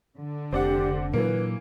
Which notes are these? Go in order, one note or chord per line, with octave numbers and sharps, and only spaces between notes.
D3
F1 C4 G4 D5 F#5
A#2 E3 F#3 A#3 B4